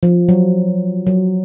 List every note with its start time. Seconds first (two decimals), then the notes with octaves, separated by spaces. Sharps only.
0.03 F3
0.29 F#3
1.07 F#3